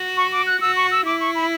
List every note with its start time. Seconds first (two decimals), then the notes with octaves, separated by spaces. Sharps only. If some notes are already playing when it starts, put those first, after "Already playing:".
Already playing: F#4
0.17 C#6
0.32 D6
0.47 F#6
0.61 F#4 E6
0.76 C#6
0.91 E6
1.06 E4 D6
1.21 C#6
1.35 B5